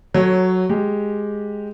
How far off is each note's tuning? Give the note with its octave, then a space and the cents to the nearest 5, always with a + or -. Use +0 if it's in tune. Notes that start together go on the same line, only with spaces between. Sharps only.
F#3 +0 A4 +0 C#5 -10
G#3 +0 G4 +0